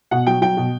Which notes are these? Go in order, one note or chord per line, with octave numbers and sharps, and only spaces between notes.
B2 F#5
F#3 G5
F#3 G5
B2